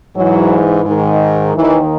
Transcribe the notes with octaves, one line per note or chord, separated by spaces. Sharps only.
G#2 E3 F#3
G#2 D#3
D#2 D#3 E3